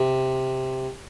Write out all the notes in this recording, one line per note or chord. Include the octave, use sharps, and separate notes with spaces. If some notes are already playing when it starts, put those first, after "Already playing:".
Already playing: C3